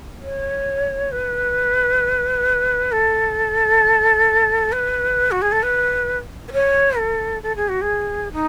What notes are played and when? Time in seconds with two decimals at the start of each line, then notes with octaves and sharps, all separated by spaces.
0.21 C#5
1.12 B4
2.92 A4
4.72 B4
5.31 F#4
5.42 G#4
5.52 A4
5.63 B4
6.48 B4
6.53 C#5
6.98 A4
7.43 A4
7.56 G#4
7.69 F#4
7.82 G#4
8.33 D#4